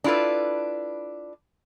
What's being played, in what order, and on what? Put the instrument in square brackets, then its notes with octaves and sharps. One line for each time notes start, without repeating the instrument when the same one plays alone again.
[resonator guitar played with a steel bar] D4 E4 F4 A4 B4